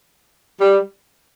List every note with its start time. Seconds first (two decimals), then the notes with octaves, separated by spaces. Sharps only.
0.59 G3